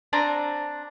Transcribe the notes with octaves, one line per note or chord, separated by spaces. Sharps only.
C4 D4 G#5 A#5